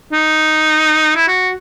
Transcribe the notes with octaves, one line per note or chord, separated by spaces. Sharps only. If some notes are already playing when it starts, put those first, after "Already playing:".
D#4
E4
F#4